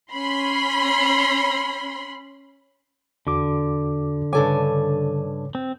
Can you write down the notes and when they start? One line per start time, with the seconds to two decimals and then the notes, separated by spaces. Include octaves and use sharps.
0.12 C#4 B5 C6
3.27 E2 D3 F#4 D6
4.33 G2 C#3 A4 C#5 G#5 D6
5.55 C4